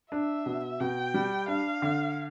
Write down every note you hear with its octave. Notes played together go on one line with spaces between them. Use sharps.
D4 E5
B2
B2 G5
G3
D4 F5
D3